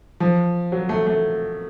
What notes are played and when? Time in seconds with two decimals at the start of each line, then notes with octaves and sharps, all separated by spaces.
0.20 F3
0.72 F#3
0.89 A3
1.07 A3